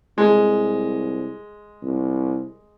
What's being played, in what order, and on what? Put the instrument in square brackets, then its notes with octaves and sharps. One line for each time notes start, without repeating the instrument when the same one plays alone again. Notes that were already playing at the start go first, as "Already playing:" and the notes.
[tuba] C2 [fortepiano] G#3
[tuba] C2